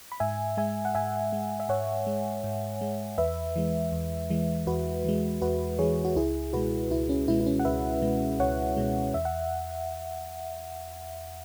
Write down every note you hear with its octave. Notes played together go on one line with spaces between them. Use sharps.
B5
G#2 E5 G#5
G#3 E5 G#5
F#5
G#2 E5 G#5
G#3
E5
G#2 C#5 F#5
G#3
G#2
G#3
E2 B4 E5
E3 G#3
E2
E3 G#3
E2 F#4 B4
E3 G#3
E2 F#4 B4
E3 G#3 G#4 C#5
F#4
C#2 E4 G#4
B2 G#3 F#4 B4
C#2 E4
C#4
B2 G#3 E4
E4
C#4
F#5
C#2 B4 E5
B2 G#3
C#2 C#5 F#5
B2 G#3
E2 E5
F#5